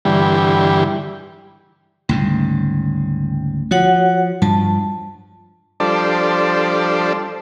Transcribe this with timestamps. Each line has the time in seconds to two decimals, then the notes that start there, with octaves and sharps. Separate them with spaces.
0.05 G2 D3 E3 G3
2.09 D2 G#2 C#3 G3
3.71 F3 F#4 C#5 F#5
4.42 G2 F3 A5
5.80 F3 G3 D4 A4 C5 D5